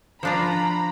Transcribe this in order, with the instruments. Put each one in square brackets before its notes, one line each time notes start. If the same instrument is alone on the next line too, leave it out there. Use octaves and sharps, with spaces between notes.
[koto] F3 D4 F4 [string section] A#5 B5